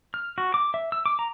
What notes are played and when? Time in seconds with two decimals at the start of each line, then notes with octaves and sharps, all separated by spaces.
0.14 F6
0.38 F#4
0.54 D6
0.74 E5
0.92 E6
1.06 D6
1.19 A#5